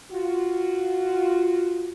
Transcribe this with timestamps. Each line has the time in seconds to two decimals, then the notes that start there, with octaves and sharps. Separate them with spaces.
0.11 F4 F#4